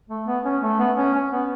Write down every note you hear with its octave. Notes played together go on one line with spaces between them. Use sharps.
A3
B3
C#4
A3
B3
C#4
C#4
B3